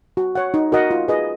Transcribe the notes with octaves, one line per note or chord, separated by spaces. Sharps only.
F#4
C#5 F#5
D#4
F#4 A#4 D#5 F#5
F4
G#4 B4 D#5